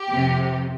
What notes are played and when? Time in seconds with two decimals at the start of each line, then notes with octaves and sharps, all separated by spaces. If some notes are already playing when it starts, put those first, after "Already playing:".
Already playing: G4
0.11 F2 C3 F3